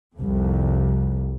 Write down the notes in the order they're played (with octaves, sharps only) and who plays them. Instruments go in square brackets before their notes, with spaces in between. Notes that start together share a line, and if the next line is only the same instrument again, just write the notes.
[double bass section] C2 F2